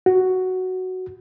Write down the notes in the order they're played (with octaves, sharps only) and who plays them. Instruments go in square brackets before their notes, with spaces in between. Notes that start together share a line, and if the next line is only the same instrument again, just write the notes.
[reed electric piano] F#4